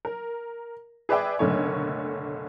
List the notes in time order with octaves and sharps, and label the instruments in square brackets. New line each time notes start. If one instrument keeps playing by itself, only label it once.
[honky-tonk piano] A#4
G#4 B4 D5 E5 G5 D6
F#1 B1 D3 A3 C#5